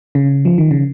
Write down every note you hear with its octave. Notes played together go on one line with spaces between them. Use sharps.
C#3
F3
D#3
C#3